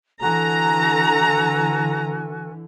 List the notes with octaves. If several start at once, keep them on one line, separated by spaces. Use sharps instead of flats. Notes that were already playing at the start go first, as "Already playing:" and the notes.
D3 E3 F#4 A4 G#5 A#5